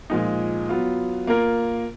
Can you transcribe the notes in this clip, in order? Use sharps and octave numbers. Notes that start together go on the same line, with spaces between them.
A#2 F3 G#3 D#4
F#3 B3 F4
A#3 F4 A#4